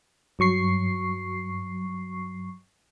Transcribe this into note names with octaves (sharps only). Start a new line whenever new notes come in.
G2 F#3 C#6 C7